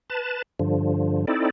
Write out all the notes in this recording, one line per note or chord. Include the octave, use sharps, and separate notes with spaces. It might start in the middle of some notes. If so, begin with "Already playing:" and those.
B4 A5
G2 D3 F3
C4 D#4 E4 A4 D5